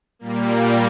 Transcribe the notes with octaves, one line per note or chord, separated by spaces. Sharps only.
A#2 G3 A#3